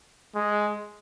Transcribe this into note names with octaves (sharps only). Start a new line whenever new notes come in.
G#3